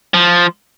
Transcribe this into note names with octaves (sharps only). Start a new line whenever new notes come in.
F3